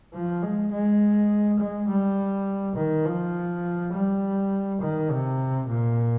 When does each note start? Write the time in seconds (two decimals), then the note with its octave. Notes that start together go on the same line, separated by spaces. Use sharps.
0.14 F3
0.42 G#3
0.72 G#3
1.59 G#3
1.88 G3
2.76 D#3
3.05 F3
3.93 G3
4.82 D#3
5.11 C3
5.68 A#2